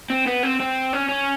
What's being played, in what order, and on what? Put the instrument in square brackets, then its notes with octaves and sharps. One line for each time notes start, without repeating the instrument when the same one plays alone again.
[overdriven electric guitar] C4
B3
C4
C4
C#4
C#4